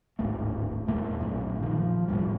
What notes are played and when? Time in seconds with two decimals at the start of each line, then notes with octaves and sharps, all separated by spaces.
0.19 D1 G#1 A2 A3
0.87 E2 A#2 A3 A#3
1.21 A#1 F#2 A#2
1.60 A#2 D#3 F3
1.77 F3
2.08 E1 D#2 A2 G3